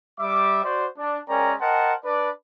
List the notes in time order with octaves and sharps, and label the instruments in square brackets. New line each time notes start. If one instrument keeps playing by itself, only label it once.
[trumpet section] G3 E5 D6
F#4 C5 D5
D4
G#3 C#4 A#4 D5 G5 A#5
A#4 C5 D#5 F#5 G5 A5
D4 B4 D5